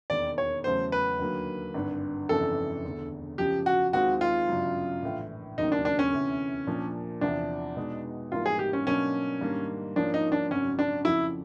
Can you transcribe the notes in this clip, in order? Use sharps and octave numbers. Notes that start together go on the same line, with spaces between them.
E1 D#2 D#3 D5
C#5
E2 C#3 F#3 A3 C#4 C5
B4
D#2 D3 F#3 A#3
G#1 G2 D3
G1 F2 C#3 E3 A4
E1 D2 D3
F#2 C#3 F3 G4
F#4
D#2 D#3 G#3 C4 F4 F#4
F4
G1 F#2 C#3 F#3
A#1 A2 E3
E1 D#2 C#3 F#3 A#3 D#4
D4
D4
C#4
D2 C3 E3
A#2 F3 A#3 D4
E2 C3 F3 D4
B2 G#3 B3 D#4
G#1 G#2 E3 G3 A#3 F4
G#4
G4
C#4
B2 F#3 A#3 C#4 D4
G#2 D#3 G3 A#3 D4
G#2 F3 A#3 C#4 D4
D#4
D4
G#1 F#2 C#3 F#3 C#4
D4
F2 C#3 F3 E4